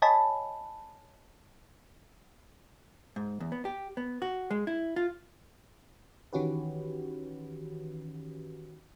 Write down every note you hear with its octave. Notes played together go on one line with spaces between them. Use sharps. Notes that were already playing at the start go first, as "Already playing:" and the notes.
C#5 D#5 G#5 A5 B5
G#2
E2
B3
G4
B3
F#4
G#3
E4
F4
D#3 E3 C#4 F#4 G4 B4